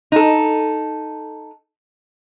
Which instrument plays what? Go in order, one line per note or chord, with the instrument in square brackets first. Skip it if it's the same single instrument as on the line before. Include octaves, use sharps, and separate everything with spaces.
[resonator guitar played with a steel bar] D#4 A4